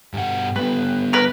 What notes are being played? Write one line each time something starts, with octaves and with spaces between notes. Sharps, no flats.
G2 B2 F#5
G3 B3 B4
A#4 B4